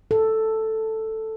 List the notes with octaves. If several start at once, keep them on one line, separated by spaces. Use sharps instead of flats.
A4